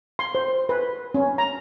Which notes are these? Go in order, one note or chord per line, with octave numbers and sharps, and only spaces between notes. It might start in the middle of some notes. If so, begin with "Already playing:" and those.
C6
C5
B4
C#4
A#5